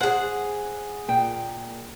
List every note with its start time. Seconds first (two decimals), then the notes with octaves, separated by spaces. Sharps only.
0.01 G#4 C5 F#5
1.08 A#2 G5